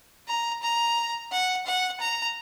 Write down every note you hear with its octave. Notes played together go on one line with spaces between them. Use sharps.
A#5
A#5
F#5
F#5
A#5